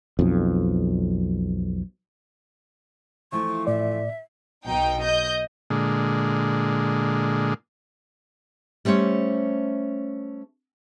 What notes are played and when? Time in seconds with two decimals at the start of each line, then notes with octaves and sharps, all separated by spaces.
0.19 B1 F2
3.32 E3 F3 A3 C#6
3.67 A2 D5 E5
4.66 B1 B2 D#4 G5
5.03 D#5 G6
5.70 A#2 D3 G#3
8.85 G3 A3 C#4 C5 C#5